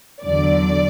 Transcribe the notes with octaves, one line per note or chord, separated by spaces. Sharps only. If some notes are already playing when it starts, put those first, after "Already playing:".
E2 D3 F#3 D5